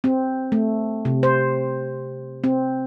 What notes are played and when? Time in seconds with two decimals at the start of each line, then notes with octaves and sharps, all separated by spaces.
0.04 C4
0.52 A3
1.05 C3
1.23 C5
2.44 C4